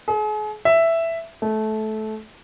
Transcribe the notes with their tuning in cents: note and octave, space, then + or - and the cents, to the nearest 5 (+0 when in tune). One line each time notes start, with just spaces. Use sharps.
G#4 +40
E5 +5
A3 -20